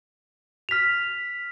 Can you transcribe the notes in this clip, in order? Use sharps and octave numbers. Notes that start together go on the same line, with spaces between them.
F6 B6 F7